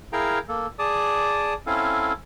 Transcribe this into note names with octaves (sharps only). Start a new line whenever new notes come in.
E4 G#4 A#4 F5 G5 A#5
A#3 A4
G#4 D5 A5 D6 D#6
C4 C#4 E4 A4 F5